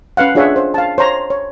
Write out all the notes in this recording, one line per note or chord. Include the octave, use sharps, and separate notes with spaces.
C#4 B4 F5 F#5
D4 F4 G#4 C#5 E5 F#5
C5
F5 A5
C5 C#5 A#5 C6
C#5